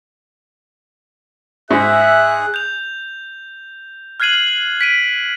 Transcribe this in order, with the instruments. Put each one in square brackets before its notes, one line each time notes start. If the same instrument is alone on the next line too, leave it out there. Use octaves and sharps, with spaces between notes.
[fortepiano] G#2 [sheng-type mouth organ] G#4 [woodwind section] E5 [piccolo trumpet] F#6
[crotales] G6 F7
F6 F#6 G#6 C7 D#7 F#7
B6 D7 D#7